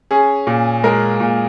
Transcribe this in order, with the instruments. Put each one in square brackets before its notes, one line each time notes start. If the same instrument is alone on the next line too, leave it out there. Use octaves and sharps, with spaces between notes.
[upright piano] C#4 G#4
A#2
G#3 A#4
A#2